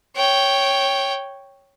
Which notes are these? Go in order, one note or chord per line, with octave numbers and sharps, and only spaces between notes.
C#5 G5